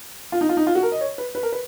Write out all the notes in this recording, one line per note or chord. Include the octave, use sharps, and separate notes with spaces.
F4
D#4
F4
D#4
F4
F#4
A#4
D#5
C#5
B4
B4
A#4
B4